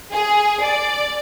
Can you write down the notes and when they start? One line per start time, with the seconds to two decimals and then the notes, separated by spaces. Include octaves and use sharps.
0.12 G#4
0.63 D5